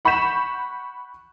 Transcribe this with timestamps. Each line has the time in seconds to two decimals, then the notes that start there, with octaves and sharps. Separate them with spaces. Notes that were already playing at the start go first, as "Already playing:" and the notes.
0.05 F#5 B5 C#6 G6 B6 E7